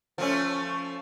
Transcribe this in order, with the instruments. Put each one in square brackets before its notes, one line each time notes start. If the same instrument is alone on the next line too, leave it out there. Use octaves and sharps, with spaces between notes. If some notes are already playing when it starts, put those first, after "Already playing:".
[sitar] F3 A3 C#4